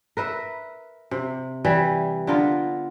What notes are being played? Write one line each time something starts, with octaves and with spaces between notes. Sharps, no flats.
A#4 B4 E5
C3
E3 G3
D3 B3 F4 A#4